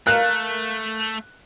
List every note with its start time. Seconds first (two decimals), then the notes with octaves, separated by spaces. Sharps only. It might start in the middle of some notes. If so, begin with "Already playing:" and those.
0.07 A3 A#4 F5 F#6